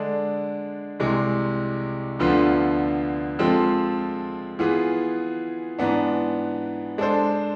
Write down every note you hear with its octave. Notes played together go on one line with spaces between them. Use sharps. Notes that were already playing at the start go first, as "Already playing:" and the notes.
Already playing: D3 G#3 D4
C2 C3 E3 G#3
D2 D3 F3 B3 F4
F3 G#3 C4 F4 A4
E3 B3 F4 G#4
G#2 E3 B3 D4
G#3 D4 A4 C5